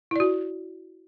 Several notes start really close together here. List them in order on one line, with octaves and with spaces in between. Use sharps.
E4 D5 F#4